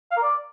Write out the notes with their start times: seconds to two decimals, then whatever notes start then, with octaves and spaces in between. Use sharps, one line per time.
0.11 F5
0.17 A#4
0.22 D5